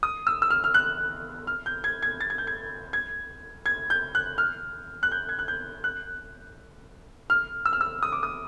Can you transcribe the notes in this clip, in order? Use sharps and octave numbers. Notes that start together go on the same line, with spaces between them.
D#6
E6
E6
F6
F6
F#6
F6
G6
G#6
G#6
A6
G#6
G6
G#6
G#6
G#6
G6
F#6
F6
F#6
G6
G#6
F#6
G6
F#6
F6
E6
F6
E6
D#6
D6
D#6